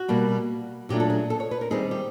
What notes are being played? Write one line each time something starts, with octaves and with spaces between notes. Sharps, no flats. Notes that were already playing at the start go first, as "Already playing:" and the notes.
Already playing: F#4
B2 G3 A#3
A#2 F#3 A3 D4 G4
A4
G#4
A4
C#5
B4
A#4
D#3 G3 C4 D#4 G#4
G4